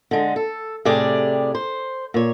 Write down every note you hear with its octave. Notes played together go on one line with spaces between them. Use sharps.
D3 G#3
A4
A2 C3 G4 G#4 D5
C5
A#2 C#5